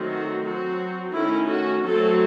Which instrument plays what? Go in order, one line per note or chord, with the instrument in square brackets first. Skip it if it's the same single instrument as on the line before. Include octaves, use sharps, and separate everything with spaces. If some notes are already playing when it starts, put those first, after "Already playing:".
Already playing: [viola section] D#3 F#3 A3 C4
F#4
F#3 C4 F#4
D#3 A3 C#4 E4
F#4
F#3 A3 C4 A4